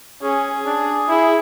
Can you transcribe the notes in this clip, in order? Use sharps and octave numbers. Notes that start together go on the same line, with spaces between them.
C#4 G#4
D4
E4